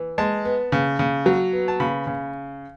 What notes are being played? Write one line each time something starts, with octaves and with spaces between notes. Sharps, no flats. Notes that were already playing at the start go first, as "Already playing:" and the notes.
Already playing: E3
G#3 A5
B3
C#3
C#3
F#3
B3
A5
C#3 B5
C#3